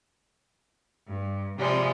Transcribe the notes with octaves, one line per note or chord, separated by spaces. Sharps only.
G2
C3 F3 G3 G#3